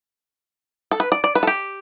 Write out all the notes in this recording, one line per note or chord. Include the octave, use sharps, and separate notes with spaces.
A4
B4
D5
D5
B4
A4
G4